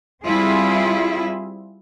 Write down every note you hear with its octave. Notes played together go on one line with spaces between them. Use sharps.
G3 C4 E4 F4 G#4